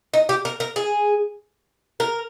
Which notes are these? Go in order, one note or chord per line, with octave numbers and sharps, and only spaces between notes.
D#4
G4
A#4
A#4
G#4
A#4